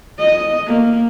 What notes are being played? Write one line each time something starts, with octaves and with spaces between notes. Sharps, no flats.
D#5
A#3